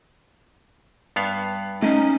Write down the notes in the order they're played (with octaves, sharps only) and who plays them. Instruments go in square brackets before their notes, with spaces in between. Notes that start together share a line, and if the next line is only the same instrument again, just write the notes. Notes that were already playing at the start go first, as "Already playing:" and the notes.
[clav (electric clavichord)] G2 B3 F5
[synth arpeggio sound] A3 [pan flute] C#4 [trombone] D#4